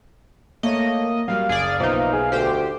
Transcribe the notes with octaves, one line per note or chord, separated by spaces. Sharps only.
A3 A#3 C#5 D#5
F#3 G3 A#3 F5
F#1 G#4 D5
B1 F3 A#3 B3 D#4 E5
G#4
D2 G4 C5 G5